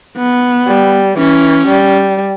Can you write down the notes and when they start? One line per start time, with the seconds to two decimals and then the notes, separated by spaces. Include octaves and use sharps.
0.17 B3
0.67 G3
1.18 E3 C#4
1.68 G3